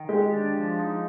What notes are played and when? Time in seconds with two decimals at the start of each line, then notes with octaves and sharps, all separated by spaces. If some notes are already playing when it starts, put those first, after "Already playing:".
Already playing: D#3
0.09 G#3 G4
0.33 D4
0.56 F3
0.79 D#4